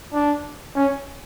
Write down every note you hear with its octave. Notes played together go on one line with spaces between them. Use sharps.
D4
C#4